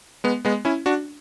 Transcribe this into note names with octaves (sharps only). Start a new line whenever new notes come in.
G#3 B3
G#3 B3
C#4 E4
D4 F#4